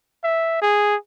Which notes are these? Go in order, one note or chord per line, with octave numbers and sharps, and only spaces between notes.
E5
G#4